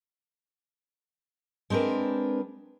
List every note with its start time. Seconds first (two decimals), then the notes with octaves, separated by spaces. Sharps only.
1.70 G#3 C4 D4 A#4 B4